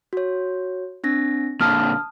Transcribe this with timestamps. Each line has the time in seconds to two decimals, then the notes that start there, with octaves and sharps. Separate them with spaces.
0.13 F#4 C#5
1.04 C4 D4 A#6
1.61 A#2 D3 A5 D#6 F6